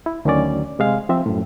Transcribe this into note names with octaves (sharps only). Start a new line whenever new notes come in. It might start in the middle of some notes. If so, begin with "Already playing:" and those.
E4
D2 D#3 F#3 C#4 D5
C3 G#3 F5
F3 C4 E5
F#2 A2